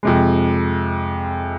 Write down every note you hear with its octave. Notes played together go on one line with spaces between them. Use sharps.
F2 C3 G#3